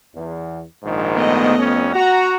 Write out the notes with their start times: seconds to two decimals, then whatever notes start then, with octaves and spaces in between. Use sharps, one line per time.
0.14 E2
0.83 A#1 G#2 D#3
1.15 A3 B3 D#5
1.59 F2 C#4
1.94 F#4 A#5